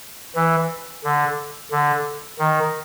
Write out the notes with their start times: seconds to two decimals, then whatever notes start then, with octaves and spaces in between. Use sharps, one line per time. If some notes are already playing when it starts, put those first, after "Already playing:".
0.35 E3
1.04 D3
1.71 D3
2.39 D#3